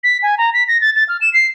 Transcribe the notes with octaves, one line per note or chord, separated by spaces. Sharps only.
B6
G#5
A#5
B6
A#6
A6
A6
F6
E7
C7